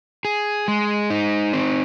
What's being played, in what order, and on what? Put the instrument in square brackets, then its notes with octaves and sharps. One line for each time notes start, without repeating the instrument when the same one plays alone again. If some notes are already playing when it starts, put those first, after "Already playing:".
[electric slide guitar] G#4
G#3
D#4
C4